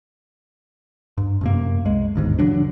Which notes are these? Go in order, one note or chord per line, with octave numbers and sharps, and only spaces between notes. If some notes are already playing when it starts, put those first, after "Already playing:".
G2
F#2 C3 A#3
C2 G#3
G1 D#2 G#2
C#3 E3 F#3 D4